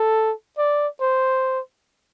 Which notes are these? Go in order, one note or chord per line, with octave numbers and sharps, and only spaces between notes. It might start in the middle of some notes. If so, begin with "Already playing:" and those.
Already playing: A4
D5
C5